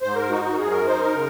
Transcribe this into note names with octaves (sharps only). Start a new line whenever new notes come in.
G#2 C5
A#4
D#4 F#4
F#4
F#2 G#4
A#4
D#4 C5
A#4
C#3